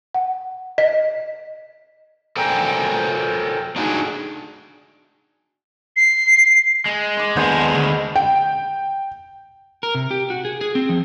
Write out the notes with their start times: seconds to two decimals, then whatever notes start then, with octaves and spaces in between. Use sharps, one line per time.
0.14 F#5
0.78 D#5
2.37 A4 A#4 C5 D5 G5 G#5
3.76 D4 D#4 F#4 G#4
5.96 C7
6.86 G#3
7.17 C6 D6
7.36 D#2 D3 B3 G#4 C5
7.74 D2
8.16 G5
9.83 A#4
9.95 C3
10.11 G4
10.30 F#4
10.45 G#4
10.61 G#4
10.75 C4
10.89 F3